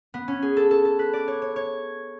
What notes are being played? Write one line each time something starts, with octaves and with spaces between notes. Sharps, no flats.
B3
C#4
G#4
A4
A4
A4
B4
D5
C#5
C#5
C#5